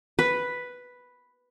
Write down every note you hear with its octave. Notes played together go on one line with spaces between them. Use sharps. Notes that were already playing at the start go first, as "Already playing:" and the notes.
B4